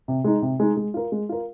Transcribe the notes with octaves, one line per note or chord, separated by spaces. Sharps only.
C3
G#3 D#4
C3
G#3 D#4
G#3
F4 A#4
G#3
F4 A#4